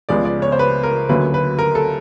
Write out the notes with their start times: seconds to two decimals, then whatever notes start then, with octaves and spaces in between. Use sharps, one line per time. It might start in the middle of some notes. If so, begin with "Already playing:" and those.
0.09 C#2 C#3 F3 G#3 B3 D5
0.25 D5
0.42 C#5
0.52 C5
0.59 B4
0.83 A#4
1.09 D2 D3 F#3 A#3 C#4 B4
1.34 B4
1.59 A#4
1.75 A4